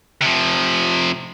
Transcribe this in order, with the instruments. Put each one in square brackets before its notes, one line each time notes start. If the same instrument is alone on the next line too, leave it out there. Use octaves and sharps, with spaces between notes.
[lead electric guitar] C3 F3